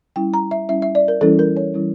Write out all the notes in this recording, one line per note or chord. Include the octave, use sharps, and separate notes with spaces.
G3 C#4 E4 G5
A#5
E5
G3 C#4 E4 E5
E5
D5
A#4
E3 G3 C#4 E4 A4
A#4
C#5
E3 G3 C#4 E4